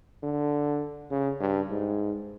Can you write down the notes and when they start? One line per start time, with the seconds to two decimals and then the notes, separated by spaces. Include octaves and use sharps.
0.23 D3
1.11 C#3
1.40 G2
1.71 G#2